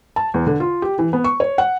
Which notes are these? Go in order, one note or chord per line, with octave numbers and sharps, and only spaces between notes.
A5
E2
D3
F4
G4
E3
B3
C#6
C#5
F#5